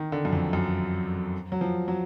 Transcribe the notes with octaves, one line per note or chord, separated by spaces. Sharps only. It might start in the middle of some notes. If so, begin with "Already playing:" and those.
Already playing: D#3
D3
F#2
F2
F#2
F#3
F3
F#3